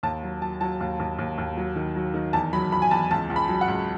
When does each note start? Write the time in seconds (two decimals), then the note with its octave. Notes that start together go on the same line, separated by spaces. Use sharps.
0.03 D#2 A5
0.23 F#3
0.41 F#3 A5
0.61 F#3 A5
0.80 D#2
1.00 D#2
1.18 D#2
1.38 D#2
1.57 F#3
1.76 D#3
1.95 F#3
2.14 D#3
2.33 E2 A5
2.53 F#3 B5
2.72 F#3 B5
2.82 G#5
2.91 E2 A5
3.11 C#2 A5
3.30 C#2
3.36 B5
3.49 F#3
3.61 F#5
3.68 C#2